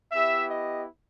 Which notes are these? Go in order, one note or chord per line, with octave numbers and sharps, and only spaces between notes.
B3 E4 G4 E5
D#5